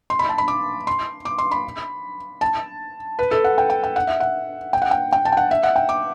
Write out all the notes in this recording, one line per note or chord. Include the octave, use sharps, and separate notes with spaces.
C6
B5
A5
B5
D6
C6
D6
C6
B5
A5
B4
A4
F#5
G5
G5
G5
F#5
E5
F#5
G5
F#5
G5
G5
A5
G5
F#5
E5
F#5
G5
D6